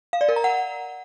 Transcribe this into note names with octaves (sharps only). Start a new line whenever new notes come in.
F5
D5
A#4
A#5
F#5